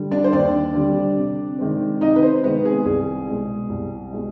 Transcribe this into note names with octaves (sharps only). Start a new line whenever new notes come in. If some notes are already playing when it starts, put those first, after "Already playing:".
Already playing: D3 G3
D4 D5
C5
D#2 D4 D5
D3 G3 C4
C3
D#3 G#3 C4
C3 D#4 D#5
B4
C4 C5
D#3 G#3 B3 C4 B4
G#4
C2 G#4
B2 G#3
C2
B2 G#3